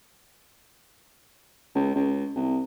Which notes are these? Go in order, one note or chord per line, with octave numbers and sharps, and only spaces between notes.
C#2
C#2
C2